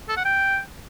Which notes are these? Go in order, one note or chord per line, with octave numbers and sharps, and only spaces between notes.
A4
F#5
G5